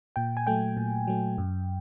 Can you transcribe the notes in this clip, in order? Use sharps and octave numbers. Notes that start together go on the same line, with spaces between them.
A#2 G5
G#5
F#3 A3 G5
A#2
F#3 A3
F#2